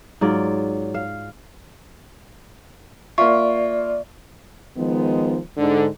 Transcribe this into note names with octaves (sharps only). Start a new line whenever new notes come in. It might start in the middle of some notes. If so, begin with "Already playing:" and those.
G#2 F#3 F4 D5
F5
A#3 F4 D5 E5 C#6
D#3 F3 G#3 B3
G#2 D3